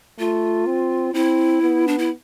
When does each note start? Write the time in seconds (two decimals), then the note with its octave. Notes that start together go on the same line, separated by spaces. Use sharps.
0.19 A3 F4
0.66 C4
1.14 C4 E4
1.62 B3
1.88 D4
1.98 E4